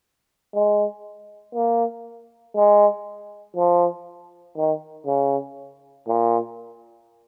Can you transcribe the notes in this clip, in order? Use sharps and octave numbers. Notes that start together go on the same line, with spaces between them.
G#3
A#3
G#3
F3
D#3
C#3
A#2